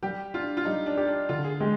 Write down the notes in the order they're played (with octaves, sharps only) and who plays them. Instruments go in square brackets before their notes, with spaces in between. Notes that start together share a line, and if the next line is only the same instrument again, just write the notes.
[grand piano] G3 [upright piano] G4
[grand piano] D4 [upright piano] F4
[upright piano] F4
[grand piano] G3 [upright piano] D#4
[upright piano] D4
[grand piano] G4
[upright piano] D4
[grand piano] D3 [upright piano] F4
[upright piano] G#4
[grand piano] G#3 [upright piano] G4